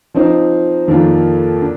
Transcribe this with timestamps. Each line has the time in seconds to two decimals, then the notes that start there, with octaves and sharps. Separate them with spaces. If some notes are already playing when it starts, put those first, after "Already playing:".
0.14 F3 C4 D#4
0.88 F2 D#3 A#3 D4 F4
1.61 D3 D4